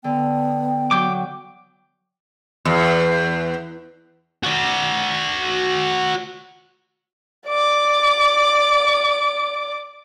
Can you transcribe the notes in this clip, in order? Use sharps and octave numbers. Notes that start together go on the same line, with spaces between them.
D3 B3 G5
F#3 F#4 D6 G6
E2
F#4 D5
D5 D6